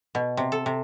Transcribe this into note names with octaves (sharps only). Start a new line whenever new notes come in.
B2
C3
A4
C3